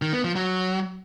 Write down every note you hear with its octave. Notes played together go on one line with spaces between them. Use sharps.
D#3
B3
F3
F#3